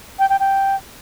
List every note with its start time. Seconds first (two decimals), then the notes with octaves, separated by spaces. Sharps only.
0.19 G5
0.30 G5
0.40 G5